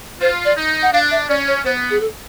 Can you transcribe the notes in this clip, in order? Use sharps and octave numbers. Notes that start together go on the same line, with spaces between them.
F4 C5
D5
D#4
F#5
D4 F5
E5
C#4 D5
C#5
B3 C5
G#4
A4